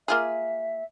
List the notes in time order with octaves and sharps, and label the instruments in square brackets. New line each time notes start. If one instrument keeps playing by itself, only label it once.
[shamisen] A#3 F4 G#4 [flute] E5